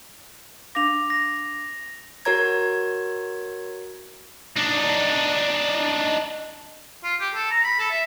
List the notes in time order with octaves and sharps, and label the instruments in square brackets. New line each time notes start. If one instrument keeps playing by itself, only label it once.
[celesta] D4 F5 D6 [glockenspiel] A#6 F7
[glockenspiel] A#6
[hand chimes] F#4 A#4 C#5 A#5 G#6
[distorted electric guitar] D4 D#4
[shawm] F4
G4
A4
A#5
B5
A4
E5